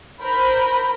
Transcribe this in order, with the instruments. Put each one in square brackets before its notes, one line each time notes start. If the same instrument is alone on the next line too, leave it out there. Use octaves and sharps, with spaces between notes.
[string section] A#4 C5 B5 G6